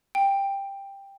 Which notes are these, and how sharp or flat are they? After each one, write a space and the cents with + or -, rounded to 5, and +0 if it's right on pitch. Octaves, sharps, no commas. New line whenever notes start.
G5 +10